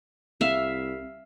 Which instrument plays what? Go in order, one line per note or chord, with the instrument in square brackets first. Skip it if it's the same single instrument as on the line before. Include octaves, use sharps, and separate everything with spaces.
[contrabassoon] C2 [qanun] E5 F5